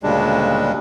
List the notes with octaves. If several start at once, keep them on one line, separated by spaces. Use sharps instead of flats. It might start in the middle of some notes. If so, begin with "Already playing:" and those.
D2 A#2 C#3 G3 G#3 D4